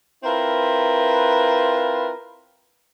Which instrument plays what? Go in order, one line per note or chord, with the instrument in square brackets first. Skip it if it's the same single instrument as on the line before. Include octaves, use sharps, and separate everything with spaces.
[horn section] C4 E4 F4 A#4 B4